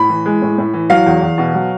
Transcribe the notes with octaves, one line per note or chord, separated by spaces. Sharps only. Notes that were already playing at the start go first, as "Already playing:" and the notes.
Already playing: A2 B5
E3
G#3
A2
A2
E3
F#3 F5
E2
E2
B2
F#3